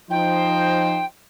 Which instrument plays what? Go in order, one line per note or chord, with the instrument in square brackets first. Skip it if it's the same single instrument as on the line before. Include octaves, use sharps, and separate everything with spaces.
[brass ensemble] F3 D#4 C5 [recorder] G5